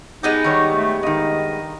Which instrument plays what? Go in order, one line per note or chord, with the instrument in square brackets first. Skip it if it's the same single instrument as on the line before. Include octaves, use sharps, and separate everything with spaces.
[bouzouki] G#3 B3 G4 [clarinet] D#4
[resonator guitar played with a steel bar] D#3 G3 C#5
[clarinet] A3
[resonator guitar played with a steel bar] G2 D#3 [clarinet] D#5